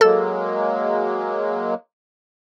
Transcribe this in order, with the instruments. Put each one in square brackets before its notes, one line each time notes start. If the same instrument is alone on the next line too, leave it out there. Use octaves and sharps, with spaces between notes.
[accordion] F#3 G#3 A#3 [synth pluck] A4 E6